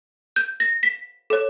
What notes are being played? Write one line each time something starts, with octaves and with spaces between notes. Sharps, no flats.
G6
A#6
B6
A4 C#5